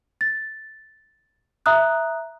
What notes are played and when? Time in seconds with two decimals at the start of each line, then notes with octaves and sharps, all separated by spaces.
0.21 A6
1.66 E5 A#5 D#6 F#6